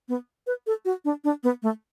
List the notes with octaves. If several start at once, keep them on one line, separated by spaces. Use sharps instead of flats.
B3
B4
A4
F#4
D4
D4
B3
A3